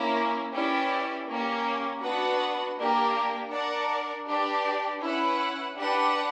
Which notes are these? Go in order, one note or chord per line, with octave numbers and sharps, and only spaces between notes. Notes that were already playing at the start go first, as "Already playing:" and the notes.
Already playing: A#3 C#4 E4
C#4 E4 G4 B4 D5
A#3 C#4 G4
B3 D4 F#4 B4 F#5
A#3 D4 G4 A#4
D4 A#4 D5 F#5
D4 G4 B4 D5
C#4 E4 B4 F#5
D4 G4 B4 F#5